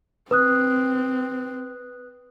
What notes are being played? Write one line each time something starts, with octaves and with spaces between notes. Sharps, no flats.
C4 B4 D#6 F#6